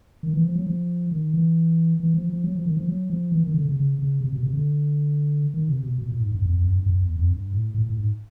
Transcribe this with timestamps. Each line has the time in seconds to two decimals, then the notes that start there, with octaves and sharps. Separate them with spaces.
0.23 D#3
0.34 E3
0.45 F3
0.55 F#3
0.67 F3
1.11 D#3
1.34 E3
2.00 E3
2.14 F3
2.29 F3
2.44 F#3
2.55 F3
2.65 D#3
2.77 F3
2.88 F#3
3.10 F3
3.32 E3
3.44 D#3
3.54 D3
3.66 C#3
3.76 C#3
3.99 C#3
4.21 C3
4.33 B2
4.43 C3
4.54 D3
5.54 D#3
5.68 C3
5.83 B2
5.98 B2
6.08 A#2
6.20 G#2
6.31 G2
6.42 F2
6.53 F2
6.65 F#2
6.76 G2
6.86 F#2
7.01 E2
7.16 F2
7.31 G2
7.53 A2
7.74 A2
7.86 A2
7.97 G#2